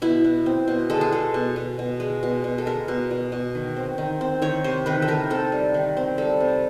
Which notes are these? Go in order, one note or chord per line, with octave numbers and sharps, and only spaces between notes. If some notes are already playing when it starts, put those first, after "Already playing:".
B2 E4
B2
C4
B2
G#3 A4
G#4
G#3 A4
B2
B2
B2
G#3
B2
B2
A4
G#3 A#4
B2
B2
B2
D#3
C4
D#3
C4
D#3 C#5
C3 C5
D#3 B4
A4
D#3 A#4
C4 A4
G3
D#3
C4
G3 A4
C3